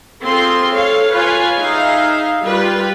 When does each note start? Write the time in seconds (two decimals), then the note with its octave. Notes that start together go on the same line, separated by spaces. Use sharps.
0.23 C4 F4 G#4 A4 C6
0.70 A4 C#5 F5
1.12 F4 B4 C#5 F5 G#5
1.57 D#4 G#4 E5 F5
2.43 G3 F4 B4